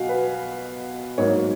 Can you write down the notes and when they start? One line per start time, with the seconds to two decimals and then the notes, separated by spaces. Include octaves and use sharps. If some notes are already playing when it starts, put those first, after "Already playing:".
Already playing: B2 F#3 F#4 D#5 F5 F#5 G#5
0.09 B4
1.18 G#2 F#3 A#3 C#5